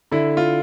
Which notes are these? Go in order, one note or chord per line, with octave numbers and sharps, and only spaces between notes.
D3 E4
F4